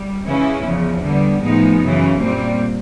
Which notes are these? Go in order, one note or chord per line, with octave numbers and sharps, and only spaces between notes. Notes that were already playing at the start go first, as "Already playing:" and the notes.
Already playing: G3
C#3 E3 G#3 C#4 E4
E2 C#3 F3
D3 G3 B3
A2 F3 G#3 B3 D#4
F#2 C#3 E3
A#2 G3 C4